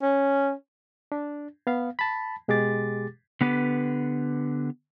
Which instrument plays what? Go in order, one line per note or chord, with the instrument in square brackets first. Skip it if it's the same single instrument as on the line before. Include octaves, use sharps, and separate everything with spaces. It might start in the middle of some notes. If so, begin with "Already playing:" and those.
[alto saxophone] C#4
[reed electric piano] D4
B3 F5
A5 B5
B2 G#3 G4 G#4 D6 A6
[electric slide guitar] D3 B3 G4 B4